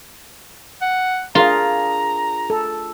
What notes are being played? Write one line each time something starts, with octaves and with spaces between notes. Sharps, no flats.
F#5
D4 F4 G#4 A#4 A#5
A4